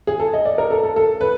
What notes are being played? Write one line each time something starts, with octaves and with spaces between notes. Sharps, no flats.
G#4
A4
D#5
D5
A#4
A4
A4
A4
B4